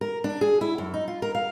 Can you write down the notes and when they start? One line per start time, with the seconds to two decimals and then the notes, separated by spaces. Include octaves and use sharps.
0.01 A#4
0.24 D4
0.41 G#4
0.61 E4
0.78 F#2
0.94 D#4
1.08 F4
1.22 A#4
1.35 F5